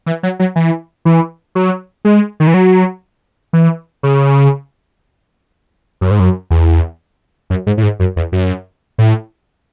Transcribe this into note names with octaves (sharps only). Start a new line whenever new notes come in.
E3
F#3
F#3
E3
E3
F#3
G#3
D#3
E3
F#3
E3
C#3
F#2
G#2
F#2
E2
F#2
G#2
A2
G#2
F#2
E2
F#2
A2